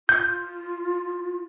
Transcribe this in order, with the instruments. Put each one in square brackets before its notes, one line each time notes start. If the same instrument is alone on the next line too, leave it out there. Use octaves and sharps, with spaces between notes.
[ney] F4 [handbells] G6